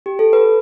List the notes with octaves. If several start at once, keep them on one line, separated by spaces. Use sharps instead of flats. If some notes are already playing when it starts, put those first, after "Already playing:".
G4
A4
B4